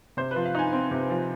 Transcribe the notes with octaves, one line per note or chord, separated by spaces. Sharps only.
C3 C5
F3 B4
F5
D#4 G#5
C4
C3
F3